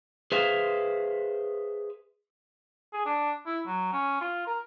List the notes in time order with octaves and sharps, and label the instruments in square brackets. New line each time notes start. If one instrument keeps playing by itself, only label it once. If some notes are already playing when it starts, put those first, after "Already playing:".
[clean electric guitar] G#4 B4 C5 E5 F5
[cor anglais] G#4
D4
E4
F#3
C#4
F4
A#4